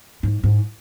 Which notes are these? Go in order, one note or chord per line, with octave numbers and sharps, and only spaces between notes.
G#2
G#2